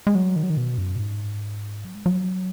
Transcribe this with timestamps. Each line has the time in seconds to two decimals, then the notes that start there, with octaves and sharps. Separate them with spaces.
0.07 G#3
0.15 F#3
0.36 D#3
0.43 F#3
0.50 D#3
0.57 B2
0.78 F#2
0.96 B2
0.99 G#2
1.85 F#3
1.95 G#3
2.06 F#3